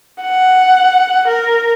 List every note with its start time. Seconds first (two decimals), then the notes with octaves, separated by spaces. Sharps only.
0.21 F#5
1.27 A#4